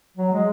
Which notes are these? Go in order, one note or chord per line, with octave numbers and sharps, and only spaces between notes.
F#3
G#3